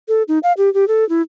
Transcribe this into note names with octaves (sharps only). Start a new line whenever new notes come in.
A4
D#4
F5
G4
G4
A4
E4